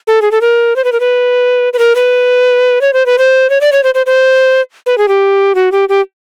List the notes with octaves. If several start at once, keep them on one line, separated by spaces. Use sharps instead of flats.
A4
G#4
A4
A#4
C5
B4
A#4
B4
B4
A#4
B4
C#5
C5
B4
C5
C#5
D5
C#5
C5
C5
C5
B4
G#4
G4
F#4
G4
G4